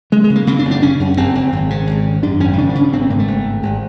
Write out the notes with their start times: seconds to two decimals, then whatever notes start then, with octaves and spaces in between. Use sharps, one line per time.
0.12 C#3 G#3
0.24 G#3
0.30 C#3
0.36 A#3
0.47 C#3 C4
0.59 D4
0.65 F#1
0.71 D4
0.82 C#3 C#4
1.00 F#2
1.17 F#1 C4
1.35 F#1
1.53 G#1
1.70 C#3
1.87 G#1
2.05 C#3
2.23 F#2 D4
2.40 G#1 C#4
2.58 C#3 D4
2.69 D4
2.75 C#3
2.81 C#4
2.93 G#1 C4
3.02 B3
3.10 G#2 A#3
3.19 A3
3.28 G#1
3.45 G#2
3.63 G#1